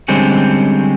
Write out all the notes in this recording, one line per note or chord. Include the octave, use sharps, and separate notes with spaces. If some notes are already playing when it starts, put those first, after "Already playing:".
D3 G3 G#3 C4 C#4